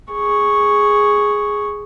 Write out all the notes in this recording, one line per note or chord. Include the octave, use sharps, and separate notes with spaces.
G#4 C#6